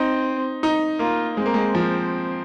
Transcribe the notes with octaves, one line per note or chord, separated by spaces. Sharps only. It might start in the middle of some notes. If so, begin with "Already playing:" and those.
Already playing: C4 D#4
D#4
A#3 F4
G#3 C4
A#3
G#3
F3